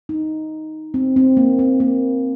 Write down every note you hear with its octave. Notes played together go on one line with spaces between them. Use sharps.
D#4
C4
C4
A#3
C4
A#3